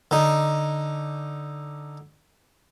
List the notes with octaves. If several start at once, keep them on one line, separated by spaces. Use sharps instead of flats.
D3 D#4